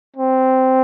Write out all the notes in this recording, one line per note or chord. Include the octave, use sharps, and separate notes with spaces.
C4